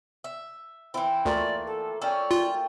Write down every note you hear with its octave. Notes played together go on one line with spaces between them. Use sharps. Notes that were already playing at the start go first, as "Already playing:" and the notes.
E5
E3 C4 E4
D2 A3 A#3 F4 D5
A4
C#4 C#5 D5 G5 E6
F4